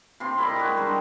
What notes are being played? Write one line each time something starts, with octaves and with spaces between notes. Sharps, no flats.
C3 G4 C6
E4 A#4 D5 D#5
G#3 F#4
G3 D4